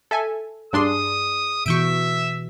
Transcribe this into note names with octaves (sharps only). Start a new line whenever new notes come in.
A4 E5 G#5
G2 D4 G#4 D5 C6 D#6
B2 E3 F#4 E5 C#6 G6 D7